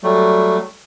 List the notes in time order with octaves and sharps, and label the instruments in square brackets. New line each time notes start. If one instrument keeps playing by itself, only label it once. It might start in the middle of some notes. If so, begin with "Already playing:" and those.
[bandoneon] F#3 G3 A3